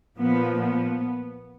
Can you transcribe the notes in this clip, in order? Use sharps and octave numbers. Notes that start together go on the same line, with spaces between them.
A#2 F3 A#3 B3
B3